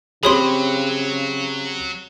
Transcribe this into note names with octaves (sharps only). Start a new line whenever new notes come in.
C#3 F#3 C4 G4 G#4 C#5 B5 C6